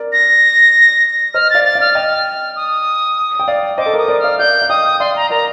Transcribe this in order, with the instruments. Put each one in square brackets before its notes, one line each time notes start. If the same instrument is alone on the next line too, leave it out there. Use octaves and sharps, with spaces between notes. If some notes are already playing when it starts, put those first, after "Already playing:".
Already playing: [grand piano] A#4 D5
[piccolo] A#6
[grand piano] C5 D#5 [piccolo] F6
[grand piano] D5 F5 [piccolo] A6
[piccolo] A6
[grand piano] D5 F5
[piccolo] F6
[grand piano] D#5 G5
[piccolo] D#6
[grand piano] G5
D5 F5
[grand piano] C5 D#5 [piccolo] D6
[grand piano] A4
[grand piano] A#4 [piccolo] D#6
[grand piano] A#4 D5
[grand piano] D5 F5 [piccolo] F6
[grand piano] D5 F5 [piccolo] G6
[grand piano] F5
[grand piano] D#5 G5 [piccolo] D#6
[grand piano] D5 F5 [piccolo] C6
[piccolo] A#5
[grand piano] A#4 D5 [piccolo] A#5